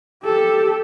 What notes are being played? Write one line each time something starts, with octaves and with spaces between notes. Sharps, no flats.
G4 A4